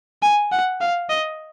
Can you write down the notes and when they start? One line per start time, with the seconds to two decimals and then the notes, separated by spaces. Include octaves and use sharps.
0.23 G#5
0.52 F#5
0.81 F5
1.10 D#5